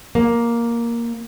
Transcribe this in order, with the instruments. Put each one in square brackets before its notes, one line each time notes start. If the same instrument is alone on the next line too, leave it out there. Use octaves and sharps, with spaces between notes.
[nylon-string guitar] A#3